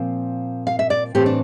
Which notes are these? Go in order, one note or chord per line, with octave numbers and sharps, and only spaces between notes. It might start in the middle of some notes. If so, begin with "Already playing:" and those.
Already playing: A#2 F3 C4 F5
F5
E5
D5
A2 E3 A3 C4 G4
D4